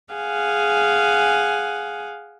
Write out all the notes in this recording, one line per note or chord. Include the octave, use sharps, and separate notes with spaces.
G#4 F5 F#5 G#5